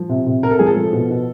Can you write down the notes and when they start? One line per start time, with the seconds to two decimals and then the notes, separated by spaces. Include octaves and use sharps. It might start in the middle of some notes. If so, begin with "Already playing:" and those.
Already playing: F3
0.09 C3
0.26 C3
0.43 C3 A#4
0.51 A4
0.59 F3 G#4
0.66 A4
0.76 F3
0.93 B2
1.10 B2